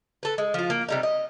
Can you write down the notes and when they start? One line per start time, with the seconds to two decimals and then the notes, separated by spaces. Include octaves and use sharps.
0.23 A4 B4
0.38 G#3
0.54 F3 F4
0.70 A#3
0.88 C3 G3 D#4
1.03 D#5